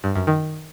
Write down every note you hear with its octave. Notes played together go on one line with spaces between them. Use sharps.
G2
F#2
D#3